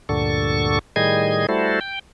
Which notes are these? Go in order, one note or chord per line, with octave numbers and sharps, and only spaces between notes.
D2 G2 A#2 D3 A4 C#6
A2 D#3 G3 G#4 D#5 G#6
G3 A3 E4 F#4 A4 C5
G5